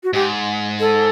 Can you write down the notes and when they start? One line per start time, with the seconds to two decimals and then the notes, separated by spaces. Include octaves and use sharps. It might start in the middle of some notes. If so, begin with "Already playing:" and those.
0.04 F#4
0.13 G#2 G4
0.80 A4